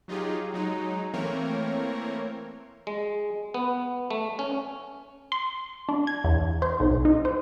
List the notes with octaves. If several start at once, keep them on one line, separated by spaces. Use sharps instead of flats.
F#3 D#4 F4 G4 G#4
F#3 G#3 D#4
E3 A3 A#3 C4 A#4 C#5
G#3
B3
A3
C#4
C6
D4
G#6
E2
C5
B1
D#4
C5